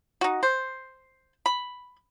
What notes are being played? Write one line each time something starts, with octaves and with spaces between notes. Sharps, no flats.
D#4 F#4
C5
B5